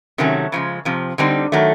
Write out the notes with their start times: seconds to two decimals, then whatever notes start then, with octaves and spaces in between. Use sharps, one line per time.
0.18 C3 D#3 F#3 A3 C#4
0.52 C#3 F3 G#3
0.85 F2 C3 F3
1.18 D3 G3 C4 D#4
1.52 D#3 F#3 A3